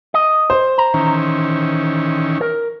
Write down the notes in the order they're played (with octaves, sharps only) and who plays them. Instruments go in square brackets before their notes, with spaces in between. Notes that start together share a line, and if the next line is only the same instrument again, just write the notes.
[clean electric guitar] D#5
[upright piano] C5
[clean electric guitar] A#5
[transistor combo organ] D#3 E3 C#4
[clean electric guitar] A#4